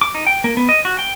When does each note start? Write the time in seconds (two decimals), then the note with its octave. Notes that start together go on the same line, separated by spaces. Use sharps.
0.01 D6
0.15 D#4
0.27 G5
0.44 A#3
0.57 B3
0.69 D#5
0.85 F#4
0.99 G5